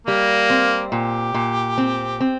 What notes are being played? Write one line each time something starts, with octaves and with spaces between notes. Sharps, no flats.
G3 A#3
C4
A#2 G4
A#2
C4
C4